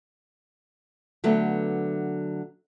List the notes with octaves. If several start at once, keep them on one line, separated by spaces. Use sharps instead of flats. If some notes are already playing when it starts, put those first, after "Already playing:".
D3 F#3 A3 B3